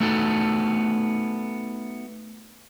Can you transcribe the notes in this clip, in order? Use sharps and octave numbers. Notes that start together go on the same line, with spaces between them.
A3 B3 D#4 F#4 A4